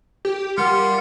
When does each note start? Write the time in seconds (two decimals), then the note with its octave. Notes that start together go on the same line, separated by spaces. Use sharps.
0.25 G4
0.57 G3 F4 A#4 F#5